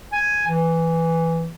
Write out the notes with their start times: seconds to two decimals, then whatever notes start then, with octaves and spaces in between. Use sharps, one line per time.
0.13 G#5
0.47 E3